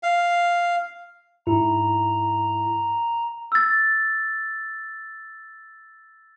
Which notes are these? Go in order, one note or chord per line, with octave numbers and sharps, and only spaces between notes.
F5
G#2 E4 A#5
E6 A6